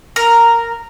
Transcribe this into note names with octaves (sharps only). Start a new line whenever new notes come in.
A#4